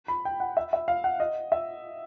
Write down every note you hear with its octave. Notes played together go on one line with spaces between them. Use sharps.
B5
G5
F#5
E5
E5
F5
F#5
D#5
E5